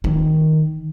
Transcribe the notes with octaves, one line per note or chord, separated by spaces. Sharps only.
D#3